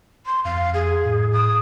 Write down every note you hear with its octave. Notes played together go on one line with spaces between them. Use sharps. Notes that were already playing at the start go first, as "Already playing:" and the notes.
C6
F2 F5
G#4
A2
D#6